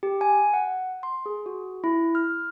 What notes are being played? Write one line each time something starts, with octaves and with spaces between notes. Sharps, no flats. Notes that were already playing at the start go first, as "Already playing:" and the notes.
G4
G#5
F#5
C6
G#4
F#4
E4
F6